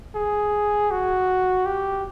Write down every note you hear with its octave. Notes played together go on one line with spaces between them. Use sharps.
G#4
F#4
G4